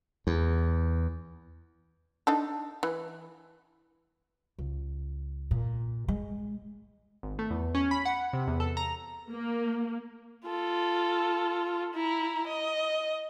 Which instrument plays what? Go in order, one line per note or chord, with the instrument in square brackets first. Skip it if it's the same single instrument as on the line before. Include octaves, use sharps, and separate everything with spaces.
[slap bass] E2
[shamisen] D4 D#4 A4
E3
[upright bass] C#2
A#2
G#3
[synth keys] G#1
A3
E2
C#4
B5
F#5
C3
E2
A4
A#5
[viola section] A#3
[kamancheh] F4 A4
E4 A#5
D#5